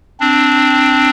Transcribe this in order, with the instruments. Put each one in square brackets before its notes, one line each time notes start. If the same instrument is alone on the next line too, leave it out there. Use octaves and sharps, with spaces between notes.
[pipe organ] C4 D4